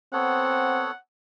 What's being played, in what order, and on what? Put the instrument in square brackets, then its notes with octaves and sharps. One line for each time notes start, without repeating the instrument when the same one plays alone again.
[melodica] B3 A4 C#5 [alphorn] C4 [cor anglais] F#5